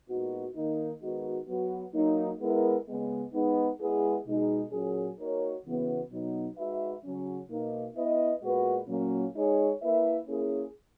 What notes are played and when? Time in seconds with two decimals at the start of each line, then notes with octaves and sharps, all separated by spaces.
0.09 A#2 G#3 B3 D#4 F#4
0.55 D#3 A#3 D#4
1.01 D#3 G#3 B3 D#4 F#4
1.48 F#3 B3 F#4
1.94 F#3 A#3 D#4
2.40 G#3 B3 E4 A#4
2.87 C#3 G#3 B3
3.33 G#3 B3 D#4
3.79 G#3 B3 E4 G#4
4.26 B2 G#3 D#4 G#4
4.71 A#2 F#3 C#4 G#4
5.18 A#3 D#4 F#4 A#4 C#5
5.65 C#3 E3 B3 F#4
6.11 B2 F#3 B3 D#4
6.57 G#3 D#4 F#4 B4 E5
7.03 C#3 F#3 C#4
7.50 B2 A#3 D#4
7.96 B3 E4 B4 D#5
8.42 A#2 G#3 B3 F#4 B4
8.88 A#2 F#3 A#3 C#4
9.34 G#3 D#4 G#4 C#5
9.81 A#3 E4 B4 E5
10.28 A#3 C#4 E4 G#4